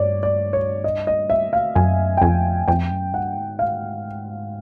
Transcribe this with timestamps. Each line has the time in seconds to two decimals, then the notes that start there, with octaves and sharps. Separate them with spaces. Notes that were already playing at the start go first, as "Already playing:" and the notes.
Already playing: G2 C#5 D5
0.23 D5
0.53 C#5
0.84 D#5
1.07 D#5
1.30 E5
1.53 F5
1.75 F#2 G#5
2.17 G5
2.21 F2 G#5
2.68 F2 G5
2.91 F#2
3.13 G2 F#5
3.37 G#2
3.59 F5